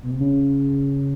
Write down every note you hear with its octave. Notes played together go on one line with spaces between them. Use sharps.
B2
C3
C#3